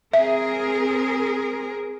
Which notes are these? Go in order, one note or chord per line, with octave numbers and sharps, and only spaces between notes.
C4 G#4 A#4 E5